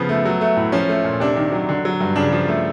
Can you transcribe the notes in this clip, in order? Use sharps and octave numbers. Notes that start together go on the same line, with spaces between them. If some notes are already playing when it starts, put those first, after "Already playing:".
Already playing: C#3 F3 B3
A3
F#3
A3
A2
F3 C#4
A3
A#2
C3 D4
D#3
F#3
D3
F#3
G2
C#3 D4
F3
A3